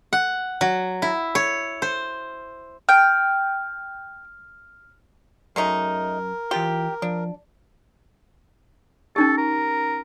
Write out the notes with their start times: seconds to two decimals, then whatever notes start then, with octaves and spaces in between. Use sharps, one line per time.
0.13 F#5
0.61 F#3
1.02 E4
1.35 C#5
1.82 C5
2.89 G5 F6
5.56 F#2 G#3 A3 D#4 A#4
6.51 E3 F4 G4 C6
7.02 F3 D4
9.16 C#4 D#4 G4 A4
9.38 A#4